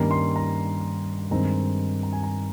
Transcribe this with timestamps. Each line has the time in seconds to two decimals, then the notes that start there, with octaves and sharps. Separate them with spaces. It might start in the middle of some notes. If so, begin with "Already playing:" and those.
Already playing: G2 D#3 G3 A#3 C#4 A#5
0.11 C6
0.36 A#5
1.31 G2 D#3 G#3 C4 A#5
2.03 A#5
2.13 G#5
2.23 A#5